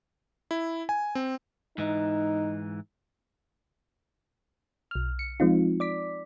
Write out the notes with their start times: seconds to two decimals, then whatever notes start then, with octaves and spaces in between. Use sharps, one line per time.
0.51 E4
0.89 G#5
1.15 C4
1.78 G#2 E3 D#4
4.91 B1 F6
5.19 C#7
5.40 F3 G#3 C4 D#4 F4
5.80 D5 D6 B6